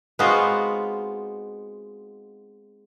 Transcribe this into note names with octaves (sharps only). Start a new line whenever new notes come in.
G#3 B3 C4 D#4 F4 F#4